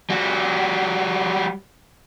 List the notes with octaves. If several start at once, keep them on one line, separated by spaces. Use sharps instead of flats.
G3 F#4